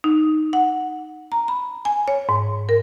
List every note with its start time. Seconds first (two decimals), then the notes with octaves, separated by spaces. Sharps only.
0.04 D#4
0.53 F#5
1.32 A#5
1.48 B5
1.85 G#5
2.08 C#5
2.29 G#2
2.69 A#4